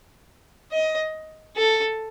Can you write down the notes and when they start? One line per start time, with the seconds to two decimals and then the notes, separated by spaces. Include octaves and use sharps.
0.72 D#5
1.57 A4